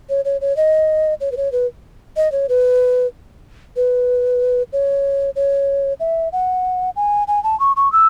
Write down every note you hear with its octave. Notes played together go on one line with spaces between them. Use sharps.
C#5
C#5
C#5
D#5
C#5
B4
C#5
B4
D#5
C#5
B4
B4
C#5
C#5
E5
F#5
G#5
G#5
A5
C#6
C#6
E6